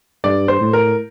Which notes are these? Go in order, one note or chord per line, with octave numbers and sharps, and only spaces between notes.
G2 D5
C5
A2
A#4